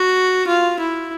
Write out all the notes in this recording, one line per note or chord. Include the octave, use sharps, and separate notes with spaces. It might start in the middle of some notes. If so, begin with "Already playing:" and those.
Already playing: F#4
F4
E4